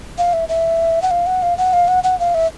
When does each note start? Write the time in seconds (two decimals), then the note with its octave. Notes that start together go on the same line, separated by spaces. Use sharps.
0.18 F5
0.33 E5
0.49 E5
1.02 F#5
1.11 F5
1.26 F#5
1.42 F5
1.58 F#5
1.73 F5
1.88 F#5
2.04 F#5
2.20 F5
2.34 E5